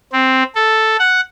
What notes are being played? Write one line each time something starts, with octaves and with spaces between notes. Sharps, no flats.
C4
A4
F#5